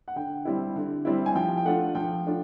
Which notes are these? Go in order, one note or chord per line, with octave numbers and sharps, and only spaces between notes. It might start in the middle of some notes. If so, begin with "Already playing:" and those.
F#5
D3 G5
G3 C4 E4
D3
G3 C4 E4
G#5
F3 G5
G5
A3 D4 F4 F#5
F3 G5
A3 D4 F4